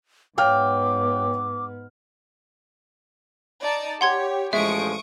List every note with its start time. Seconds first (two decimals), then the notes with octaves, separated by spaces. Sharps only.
0.38 G#2 F#3 B3 F5 G5 D6 F6
3.62 D#4 D5 A5
4.01 G4 C#5 F#5 C6 G#6
4.53 A1 D2 F3 G#3 E5 C#6 D#6 D7